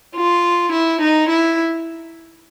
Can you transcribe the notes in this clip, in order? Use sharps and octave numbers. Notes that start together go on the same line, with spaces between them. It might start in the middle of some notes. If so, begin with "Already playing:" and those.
F4
E4
D#4
E4